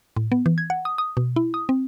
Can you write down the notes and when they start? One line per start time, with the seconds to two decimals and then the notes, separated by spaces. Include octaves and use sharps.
0.16 A2
0.32 B3
0.46 E3
0.58 G#6
0.70 F#5
0.85 D#6
0.98 D#6
1.17 B2
1.36 E4
1.54 D#6
1.69 C4